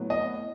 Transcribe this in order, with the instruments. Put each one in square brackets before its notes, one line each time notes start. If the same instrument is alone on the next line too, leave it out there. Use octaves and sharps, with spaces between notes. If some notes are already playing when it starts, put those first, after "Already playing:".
Already playing: [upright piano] A2 F#3 B3
D#5